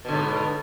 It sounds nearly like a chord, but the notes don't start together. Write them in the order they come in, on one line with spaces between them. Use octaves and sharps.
B2 D3 G#2